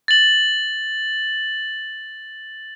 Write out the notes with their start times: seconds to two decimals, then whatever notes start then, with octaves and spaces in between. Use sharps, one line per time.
0.08 A6 F#7